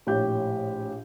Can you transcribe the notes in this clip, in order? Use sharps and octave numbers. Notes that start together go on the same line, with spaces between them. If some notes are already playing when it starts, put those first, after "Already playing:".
A#1 A2 G4 C#5 G6